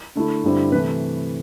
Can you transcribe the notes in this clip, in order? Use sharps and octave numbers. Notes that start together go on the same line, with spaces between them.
D3 A3 E4
G2 D3 G3 C4 E4
C3 E3 A3 B4